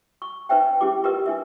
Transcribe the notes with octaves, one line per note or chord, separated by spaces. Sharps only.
C#6
D#4 B4 C5 E5 G5
C#4 E4 G4 G#4 D6
F4 G4 A#4 B4 D#5
D4 E4 E5